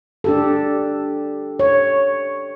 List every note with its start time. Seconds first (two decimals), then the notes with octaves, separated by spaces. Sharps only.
0.24 D4 G4 A4
1.59 C#5